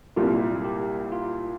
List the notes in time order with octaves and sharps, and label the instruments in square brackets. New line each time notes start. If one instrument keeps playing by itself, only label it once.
[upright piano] C2 A#2 G3 [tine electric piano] F4
[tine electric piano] G4
F4